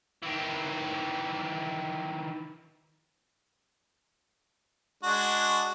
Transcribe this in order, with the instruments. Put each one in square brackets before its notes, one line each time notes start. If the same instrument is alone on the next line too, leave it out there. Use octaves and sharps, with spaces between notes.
[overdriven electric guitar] D#3 E3
[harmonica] G#3 D4 F#4